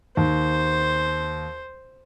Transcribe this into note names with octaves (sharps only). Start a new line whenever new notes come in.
D#2 C5